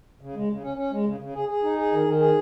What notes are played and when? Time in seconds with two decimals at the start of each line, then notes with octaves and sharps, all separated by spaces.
0.21 C#3
0.35 G#3
0.49 C#3
0.63 C#4
0.77 C#4
0.91 G#3
1.06 C#3
1.20 C#3
1.35 G#4
1.49 G#4
1.63 D#4
1.78 G#4
1.92 D#3
2.05 D#3
2.20 G#4